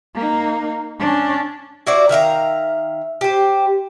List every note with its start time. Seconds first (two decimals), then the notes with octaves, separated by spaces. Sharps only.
0.14 A#3 D#4
0.99 C#4 D4
1.87 E4 F#4 C5 D5
2.09 D#3 E5 F5 A#5
3.21 G4 C5